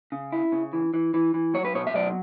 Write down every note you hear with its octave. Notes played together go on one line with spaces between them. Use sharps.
C#3
E4
C#3
E3
E3
E3
E3
F#3 C#5
B4
B2 C#5
E5
F#3 D5